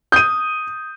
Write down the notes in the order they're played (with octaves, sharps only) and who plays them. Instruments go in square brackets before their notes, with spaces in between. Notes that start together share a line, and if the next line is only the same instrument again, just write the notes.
[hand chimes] D#6 [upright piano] G6 D#7